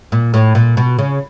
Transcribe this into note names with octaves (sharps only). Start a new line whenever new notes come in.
A#2
A2
A#2
B2
C#3